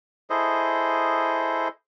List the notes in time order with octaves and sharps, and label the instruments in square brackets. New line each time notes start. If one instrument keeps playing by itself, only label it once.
[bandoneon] E4 G#4 A4 C5 D#5